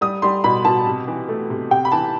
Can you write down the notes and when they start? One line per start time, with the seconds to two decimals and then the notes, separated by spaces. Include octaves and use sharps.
0.01 G3 D#6
0.22 G3 C6
0.44 B2 B5
0.65 B2 A5
0.86 C3
1.08 E3
1.28 A3
1.50 C3
1.71 C3 G5
1.85 B5
1.92 E3 A5